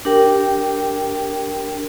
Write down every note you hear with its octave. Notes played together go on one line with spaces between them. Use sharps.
D4 G4 A#4 G5